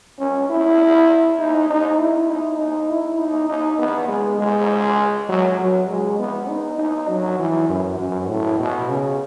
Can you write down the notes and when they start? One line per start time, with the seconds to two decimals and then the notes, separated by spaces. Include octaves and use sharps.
0.19 C#4
0.49 E4
1.39 D#4
1.69 D#4
1.98 E4
2.29 D#4
2.59 D#4
2.89 E4
3.19 D#4
3.49 D#4
3.78 B3
4.09 G#3
4.38 G#3
5.29 F#3
5.59 F#3
5.89 G#3
6.19 B3
6.49 D#4
6.78 D#4
7.08 F#3
7.39 E3
7.69 F#2
7.98 F#2
8.28 A2
8.59 B2
8.89 C#3